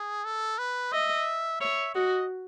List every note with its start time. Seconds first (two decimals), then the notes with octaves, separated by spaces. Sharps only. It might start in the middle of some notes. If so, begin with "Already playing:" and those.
Already playing: G#4
0.25 A4
0.58 B4
0.92 D#5 E5
1.61 C#5 E5
1.95 F#4 D#5